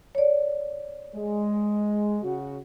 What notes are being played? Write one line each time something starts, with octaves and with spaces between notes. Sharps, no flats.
C#5 D5
G#3
C#3 F#4